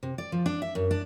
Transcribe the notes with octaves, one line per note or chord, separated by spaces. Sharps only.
C3
D5
F3
D4
E5
F#2
D4